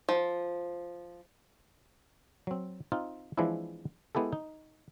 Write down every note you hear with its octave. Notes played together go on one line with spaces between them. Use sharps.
F3
F#3 C4
C4 D#4 F4
E3 F3 G#3 C4 D4 E4
G#3 B3 E4 G4 A4
D#4